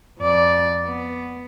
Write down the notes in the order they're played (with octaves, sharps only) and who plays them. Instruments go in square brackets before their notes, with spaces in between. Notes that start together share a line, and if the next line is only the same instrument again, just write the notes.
[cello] F2 D5
B3